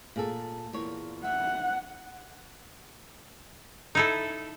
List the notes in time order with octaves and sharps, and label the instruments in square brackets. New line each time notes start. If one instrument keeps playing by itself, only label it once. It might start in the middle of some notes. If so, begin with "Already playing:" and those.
[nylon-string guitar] A#2 G#4 A4
E2 A#2 C#5
[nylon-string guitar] E5 [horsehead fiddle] F#5
[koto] D#4 E4 A4